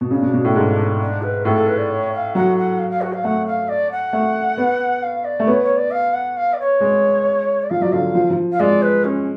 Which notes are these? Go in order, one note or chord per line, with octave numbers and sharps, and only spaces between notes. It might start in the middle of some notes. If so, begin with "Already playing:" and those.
B2
C#3 D4
B2
B2
A2
G#2
D4
B4
A2 A4
A4
B4
D5
C#5
F5
F#3 F#5
F#5
F5
F5
F#4
F5
A3 F#5
F5
D5
F#5
A3
B3
F5
D5
A3
B3 C#5
C#5
D5
F5
F#5
F5
D5
C#5
G#3
D5
F3 F5
F#3 D5
D3 F5
F3
F3
F5
G#3 D5
B4
C#4